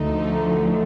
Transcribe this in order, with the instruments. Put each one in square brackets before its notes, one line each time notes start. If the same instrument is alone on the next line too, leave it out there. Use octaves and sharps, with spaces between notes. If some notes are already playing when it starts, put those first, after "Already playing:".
Already playing: [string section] D2 D3 F3 A3 D#4